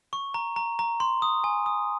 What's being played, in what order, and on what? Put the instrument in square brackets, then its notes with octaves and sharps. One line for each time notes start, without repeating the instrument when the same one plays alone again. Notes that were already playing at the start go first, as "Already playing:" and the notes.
[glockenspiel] C#6
A#5
A#5
A#5
C6
D#6
G#5
D#6